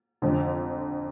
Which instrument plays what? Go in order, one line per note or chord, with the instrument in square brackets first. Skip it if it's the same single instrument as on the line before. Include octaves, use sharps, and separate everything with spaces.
[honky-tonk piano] F1 F2 D3